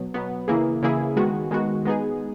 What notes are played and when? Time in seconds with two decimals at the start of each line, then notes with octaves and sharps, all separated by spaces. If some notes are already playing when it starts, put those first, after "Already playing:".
Already playing: B2 F#3 B3
0.14 B2 F#3 B3
0.48 C#3 E3 A#3 E4 G#4
0.83 C#3 E3 A#3 E4 G#4
1.16 D#3 G#3 B3 F#4
1.51 D#3 G#3 B3 F#4
1.85 G#3 B3 D#4 G#4